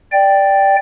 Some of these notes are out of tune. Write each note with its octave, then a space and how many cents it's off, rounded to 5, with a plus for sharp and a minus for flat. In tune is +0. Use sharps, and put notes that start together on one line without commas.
D5 +0 G5 +0